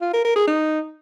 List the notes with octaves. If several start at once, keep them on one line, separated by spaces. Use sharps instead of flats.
F4
A#4
A#4
G#4
D#4